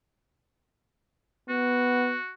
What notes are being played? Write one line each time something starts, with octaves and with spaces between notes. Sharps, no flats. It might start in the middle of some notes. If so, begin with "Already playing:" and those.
B3 F#4